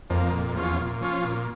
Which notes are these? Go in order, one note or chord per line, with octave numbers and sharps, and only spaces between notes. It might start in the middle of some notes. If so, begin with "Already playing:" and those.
F2 F3 A#3
F2 A#2
F2
E2 F3 C#4 F4
A#2
F3 C#4 F4
A#2